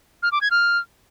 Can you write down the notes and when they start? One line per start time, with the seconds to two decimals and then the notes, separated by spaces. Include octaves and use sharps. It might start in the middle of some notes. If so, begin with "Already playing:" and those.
0.23 F6
0.32 D6
0.41 G#6
0.51 F6